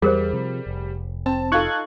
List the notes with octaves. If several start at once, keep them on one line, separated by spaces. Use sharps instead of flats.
E2 G3 G#4 A#4 C5
C3 F3
F1
C4 A5
D#4 F4 A4 C#6 F#6 G#6